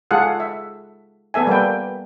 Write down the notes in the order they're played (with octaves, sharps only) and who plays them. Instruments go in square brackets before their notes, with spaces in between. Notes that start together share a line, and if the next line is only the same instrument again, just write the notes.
[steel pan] G#3 F4 G#4 A4 F5 F#5
E5
B3 A4 E5 G#5
G3 A#3 B4 G5